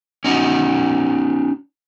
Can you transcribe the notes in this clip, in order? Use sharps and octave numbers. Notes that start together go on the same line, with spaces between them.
C#4 D#4 F#4